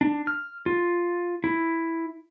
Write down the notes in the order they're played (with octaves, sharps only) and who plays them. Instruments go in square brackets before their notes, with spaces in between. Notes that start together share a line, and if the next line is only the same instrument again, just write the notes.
[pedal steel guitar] D4
F6
F4
E4